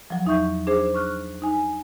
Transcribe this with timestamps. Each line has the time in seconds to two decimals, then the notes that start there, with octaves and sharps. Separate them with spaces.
0.10 F3 F#3
0.25 E2 D#4 E5 C#6 G6
0.67 D4 G#4 C5
0.94 C#6 F6 F#6
1.42 D#4 G#5